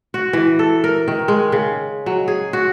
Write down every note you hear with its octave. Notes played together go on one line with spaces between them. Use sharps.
F#4
E3
A4
A#4
D#3
G#3
C#3
F#3
G#4
F#4